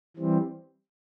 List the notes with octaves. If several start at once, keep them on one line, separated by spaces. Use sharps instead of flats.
E3 G3 C4